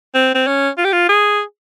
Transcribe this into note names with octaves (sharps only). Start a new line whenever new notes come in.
C4
C4
C#4
F4
G4
F4
G#4